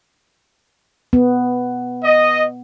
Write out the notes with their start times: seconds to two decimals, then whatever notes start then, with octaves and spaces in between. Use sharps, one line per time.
1.13 B3
2.03 D#5